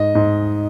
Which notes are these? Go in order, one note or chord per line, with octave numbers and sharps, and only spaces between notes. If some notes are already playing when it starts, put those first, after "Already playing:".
Already playing: G#2 D#5
G#2